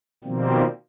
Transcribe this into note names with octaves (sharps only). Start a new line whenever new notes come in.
B2 D#3 F3 G3 A#3 C4